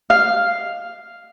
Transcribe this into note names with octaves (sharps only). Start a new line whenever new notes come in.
F5